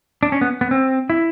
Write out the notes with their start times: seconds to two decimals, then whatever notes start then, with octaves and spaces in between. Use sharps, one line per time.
0.23 D4
0.32 C#4
0.41 B3
0.61 B3
0.71 C4
1.10 E4